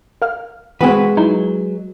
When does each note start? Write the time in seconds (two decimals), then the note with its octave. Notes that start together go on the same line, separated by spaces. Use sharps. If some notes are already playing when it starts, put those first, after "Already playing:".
0.22 A#4 F5 F6
0.81 E3 G#3 B3 C4 F#4 B4
1.17 F#3 D#4 E4